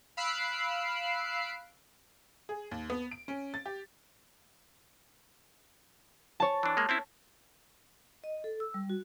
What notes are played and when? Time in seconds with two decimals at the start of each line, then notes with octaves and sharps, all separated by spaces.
0.17 F5 B5 E6 F#6 C7 D7
2.49 G#4
2.71 D#2
2.90 B3
3.11 D7
3.28 C#4
3.54 A6
3.66 G4
6.40 C#5 A5
6.63 E3 D4
6.77 G#3 A#3
6.89 C4 C#4 E4
8.24 D#5
8.44 A4
8.60 E6
8.74 G3
8.90 F#4